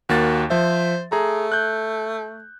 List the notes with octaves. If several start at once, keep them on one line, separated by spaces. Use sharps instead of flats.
D#2 A#3 F#4 A6
F3 C5 E5
A3 G#4 A#5
F#6 G6